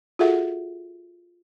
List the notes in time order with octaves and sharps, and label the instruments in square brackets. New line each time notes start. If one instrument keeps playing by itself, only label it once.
[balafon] F4 F#4 G#4 A4 E5 F#5